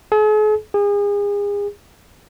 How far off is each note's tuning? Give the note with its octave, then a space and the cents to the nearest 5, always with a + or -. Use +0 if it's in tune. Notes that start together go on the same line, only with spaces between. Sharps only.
G#4 +45
G#4 -35